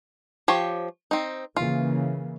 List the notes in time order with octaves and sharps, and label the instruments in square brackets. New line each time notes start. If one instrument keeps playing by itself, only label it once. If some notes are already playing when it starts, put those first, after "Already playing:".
[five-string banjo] F3 G4 C#5
C4 D#4
[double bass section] C#3 E3 A#3 [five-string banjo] F4